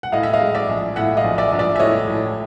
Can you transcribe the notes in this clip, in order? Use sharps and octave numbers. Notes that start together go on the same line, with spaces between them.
F#5
A2 D#5 F5
E5
D#5 F5
G#3
D5 E5
A#1
A2 E5 F#5
D#5 F5
A#1
D5 E5
A#1
D5 E5
E5
A2 C#5 D#5
A2